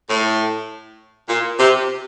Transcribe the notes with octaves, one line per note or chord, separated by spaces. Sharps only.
A2
A#2
C3